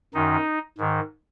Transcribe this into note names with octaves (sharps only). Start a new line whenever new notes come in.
F#2 D#3 D#4
G#2 D#3